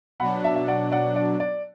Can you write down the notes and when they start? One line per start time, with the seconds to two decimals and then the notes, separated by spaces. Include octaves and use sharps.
0.20 B2 F#3 D4 F#5 B5
0.44 E5 A5
0.56 E5
0.68 D5 F#5
0.92 D5 F#5
1.16 D5
1.40 D5